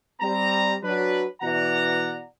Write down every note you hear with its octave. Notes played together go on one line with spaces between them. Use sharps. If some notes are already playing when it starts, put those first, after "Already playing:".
G3 C4 A#5
F#3 D4 B4
B2 E3 D5 F#5 A#5